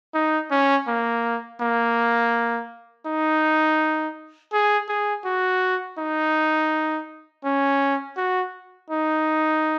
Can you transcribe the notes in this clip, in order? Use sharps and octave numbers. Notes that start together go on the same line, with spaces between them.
D#4
C#4
A#3
A#3
D#4
G#4
G#4
F#4
D#4
C#4
F#4
D#4